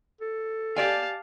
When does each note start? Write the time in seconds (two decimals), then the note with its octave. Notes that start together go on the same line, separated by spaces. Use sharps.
0.21 A4
0.76 G4 D5 F5 G#5 A5